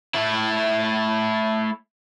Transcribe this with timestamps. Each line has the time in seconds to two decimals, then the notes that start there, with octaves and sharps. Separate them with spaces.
0.14 A3 E4